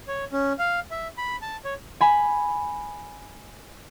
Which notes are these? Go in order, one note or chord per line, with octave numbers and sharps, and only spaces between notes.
C#5
C#4
F5
E5
B5
A5
C#5
G#5 B5